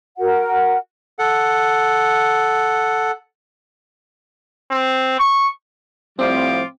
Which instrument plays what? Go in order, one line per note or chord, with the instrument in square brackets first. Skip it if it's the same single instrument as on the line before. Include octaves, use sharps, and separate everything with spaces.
[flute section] F#4 A#4 F#5
[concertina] A4 F#5
[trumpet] C4
C#6
[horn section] A2 F3 G3 [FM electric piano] C4 [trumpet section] F4 D6